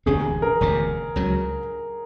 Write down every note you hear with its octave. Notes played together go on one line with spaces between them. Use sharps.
E1 D2 C3 G#4
A#4
E1 D2 C3
C#2 C#3 F#3